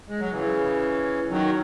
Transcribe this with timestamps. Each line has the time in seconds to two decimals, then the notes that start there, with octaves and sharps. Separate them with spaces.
0.09 G#3
0.20 F#3
0.32 C#3 E3
1.30 D#3 F#3